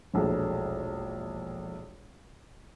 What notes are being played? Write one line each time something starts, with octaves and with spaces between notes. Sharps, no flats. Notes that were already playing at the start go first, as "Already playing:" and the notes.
E1 A#1 A3